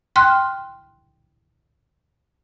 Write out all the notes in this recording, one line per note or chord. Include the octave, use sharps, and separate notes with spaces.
G5 C6 F6 F#6